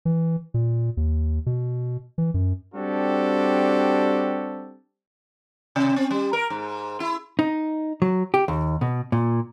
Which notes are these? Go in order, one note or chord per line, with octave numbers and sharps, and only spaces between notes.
E3
A#2
D#2
B2
E3
F#2
G3 C4 D4 F#4 G4 A4
C3
C4
G3
A#4
G#2
E4
D#4
F#3
G4
D#2
B2
A#2